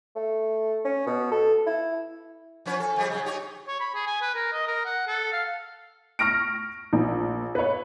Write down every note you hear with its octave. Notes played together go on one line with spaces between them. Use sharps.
A3
C#4
B2
A4
E4
F3 C#4 B4
A4
F2 G3 G#4
C#3 F#3
D#4 G4 C#5
C#5
B5
G#4
G#5
B4
A#4
D#5
A#4
F#5
A4
F5
C#6 F6 A#6 D7
A#1
B4 C#5